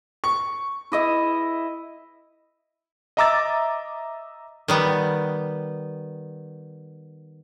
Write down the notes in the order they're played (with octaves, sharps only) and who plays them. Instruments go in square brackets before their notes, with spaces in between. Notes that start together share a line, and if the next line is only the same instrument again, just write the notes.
[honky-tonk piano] C#6
[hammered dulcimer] E4 D#5 E5
[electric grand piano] D#5 E5 A#5 D6 E6 A6
[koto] D#3 G3 B3